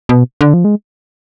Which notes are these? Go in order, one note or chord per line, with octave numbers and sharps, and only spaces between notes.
B2
D3
F3
G#3